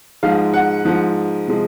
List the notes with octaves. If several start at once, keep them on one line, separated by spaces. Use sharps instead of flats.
G#2 F3 G#3 F5
F#5
G#2 F3 G#3
C3 F3 G#3